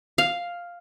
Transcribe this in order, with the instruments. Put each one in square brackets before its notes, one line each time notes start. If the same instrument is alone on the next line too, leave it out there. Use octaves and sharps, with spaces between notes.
[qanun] F5